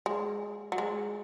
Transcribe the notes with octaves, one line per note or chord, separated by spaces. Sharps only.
G#3
F#3
G#3